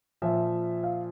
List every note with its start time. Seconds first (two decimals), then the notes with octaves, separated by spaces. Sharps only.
0.22 A#2 F3 E5
0.84 F5